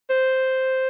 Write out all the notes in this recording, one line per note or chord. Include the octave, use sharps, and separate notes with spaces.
C5